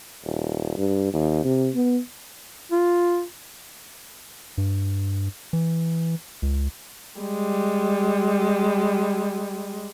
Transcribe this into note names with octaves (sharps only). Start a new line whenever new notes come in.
D#1
G2
D#2
C3
B3
F4
G2
E3
C#2
G3 G#3